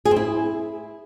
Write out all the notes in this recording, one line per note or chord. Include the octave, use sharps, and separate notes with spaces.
G#4
C4
E4